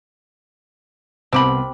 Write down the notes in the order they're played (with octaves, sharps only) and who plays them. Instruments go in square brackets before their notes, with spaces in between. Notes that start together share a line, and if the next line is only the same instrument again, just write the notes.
[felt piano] C2 B3 [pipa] C4 G4 B5